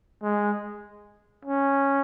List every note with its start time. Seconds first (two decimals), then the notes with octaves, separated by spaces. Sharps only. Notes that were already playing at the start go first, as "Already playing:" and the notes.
0.23 G#3
1.45 C#4